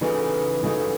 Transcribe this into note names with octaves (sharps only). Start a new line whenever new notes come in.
C#3 E3 A3 D#4 F#4
C#3 E3 A3 D#4 F#4